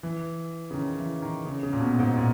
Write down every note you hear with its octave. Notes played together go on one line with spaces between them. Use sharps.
E3
C#3
D#3
E3
D#3
C#3
C#3
A#2
B2
A#2
G#2
A#2